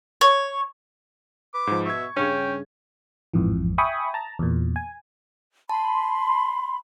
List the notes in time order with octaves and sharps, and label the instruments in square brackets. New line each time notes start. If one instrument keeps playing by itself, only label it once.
[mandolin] C#5
[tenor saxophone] B4 [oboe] D6
[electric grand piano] G#2 F3
[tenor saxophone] B2 [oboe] E5 [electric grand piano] C#6 G#6
[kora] G2 C#3 [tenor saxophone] C#4 [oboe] G5
[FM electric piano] A1 F2 G#2 E3
E5 G5 G#5 B5 C#6 D#6
A5 A#5
E2 A#2
G#5
[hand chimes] A5 [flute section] B5 C6